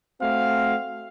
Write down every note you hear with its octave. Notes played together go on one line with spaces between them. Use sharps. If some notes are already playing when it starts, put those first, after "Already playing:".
A3 C4 F#4 F5